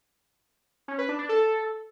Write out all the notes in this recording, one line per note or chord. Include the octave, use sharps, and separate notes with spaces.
C#4
B4
D4
D4
A4